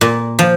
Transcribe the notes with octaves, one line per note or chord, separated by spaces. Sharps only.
A#2
F3